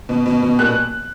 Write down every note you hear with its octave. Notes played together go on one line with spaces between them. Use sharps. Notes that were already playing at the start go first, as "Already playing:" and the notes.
B2
B2
B2
A#2 F#6